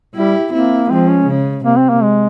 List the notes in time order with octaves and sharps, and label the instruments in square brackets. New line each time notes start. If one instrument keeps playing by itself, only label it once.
[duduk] G3 [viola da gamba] E4 G4
[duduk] A#3 [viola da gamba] C4 E4
[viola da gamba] F3 G#3 [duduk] C4
[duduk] C#4
[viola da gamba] C#3
[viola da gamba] C3 [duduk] A#3
[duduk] C4
A#3
G#3